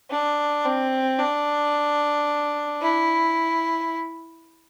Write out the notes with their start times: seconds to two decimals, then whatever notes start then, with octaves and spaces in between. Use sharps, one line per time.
0.10 D4
0.65 C4
1.18 D4
2.82 E4